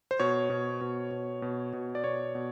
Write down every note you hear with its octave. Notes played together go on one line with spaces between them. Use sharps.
C5
B2 C#5
B2
B2
B2
B2
B2
D5
B2 C#5
B2